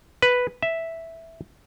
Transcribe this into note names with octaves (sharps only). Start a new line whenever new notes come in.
B4
E5